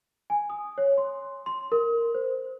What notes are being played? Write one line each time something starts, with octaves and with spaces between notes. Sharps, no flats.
G#5
D#6
C#5
C6
C6
A#4
C5